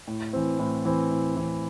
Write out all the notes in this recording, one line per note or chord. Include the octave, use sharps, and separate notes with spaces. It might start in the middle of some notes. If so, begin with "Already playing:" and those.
A2
E3 C4
A2
E3 C4
A2
E3 C4